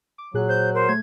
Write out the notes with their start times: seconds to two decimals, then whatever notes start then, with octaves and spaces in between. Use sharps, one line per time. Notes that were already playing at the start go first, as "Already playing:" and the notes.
0.18 D6
0.34 A#2 F#3 G#4 F#6
0.49 C5 G6
0.74 A#4 C5
0.89 A3 G#6